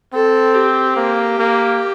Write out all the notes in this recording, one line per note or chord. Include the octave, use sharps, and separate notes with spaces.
C4 A4
G4
A#3
A#3